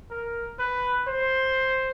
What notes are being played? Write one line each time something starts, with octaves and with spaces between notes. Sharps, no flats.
A#4
B4
C5